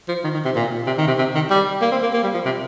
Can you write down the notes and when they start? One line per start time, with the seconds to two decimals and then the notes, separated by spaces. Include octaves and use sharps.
0.08 F3
0.24 D#3
0.34 D#3
0.45 C3
0.56 A#2
0.87 C3
0.98 D#3
1.08 C3
1.18 C3
1.35 D#3
1.50 G3
1.82 A#3
1.92 C4
2.03 A#3
2.14 A#3
2.23 G3
2.34 F3
2.45 C3